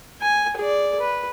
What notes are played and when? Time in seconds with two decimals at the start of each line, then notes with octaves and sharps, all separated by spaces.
0.21 G#5
0.57 G#4 D5
1.00 B4